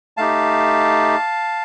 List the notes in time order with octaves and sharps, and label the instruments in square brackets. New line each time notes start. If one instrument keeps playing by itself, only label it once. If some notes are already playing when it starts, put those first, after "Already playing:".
[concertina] A3 D#4 G4 F5 A5